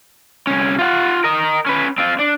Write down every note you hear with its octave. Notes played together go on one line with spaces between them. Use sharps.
C2 C#4
F4 F#5
A#4 D#5
C#4 B4
C4 F4
D4